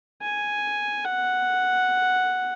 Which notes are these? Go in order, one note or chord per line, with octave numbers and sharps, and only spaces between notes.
G#5
F#5